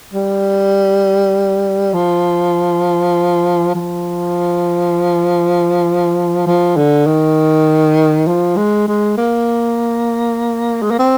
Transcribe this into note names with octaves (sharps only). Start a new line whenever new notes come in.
G3
F3
F3
F3
D3
D#3
F3
G#3
G#3
A#3
G#3
A#3
C4